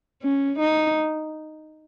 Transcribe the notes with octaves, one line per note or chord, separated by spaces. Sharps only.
C#4
D#4